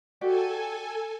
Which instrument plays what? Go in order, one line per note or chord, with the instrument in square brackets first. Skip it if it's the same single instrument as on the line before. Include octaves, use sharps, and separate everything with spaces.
[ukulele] F#4 G4 D5 [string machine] A4 G#5